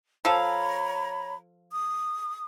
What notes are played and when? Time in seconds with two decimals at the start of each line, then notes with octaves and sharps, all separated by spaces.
0.25 F3 A4 C#5 F5 A#5 B5
1.71 D#6